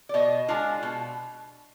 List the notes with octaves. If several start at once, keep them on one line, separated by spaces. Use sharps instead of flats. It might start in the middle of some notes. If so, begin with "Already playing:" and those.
D5
B2 D#5
G#3 D4 F4
B2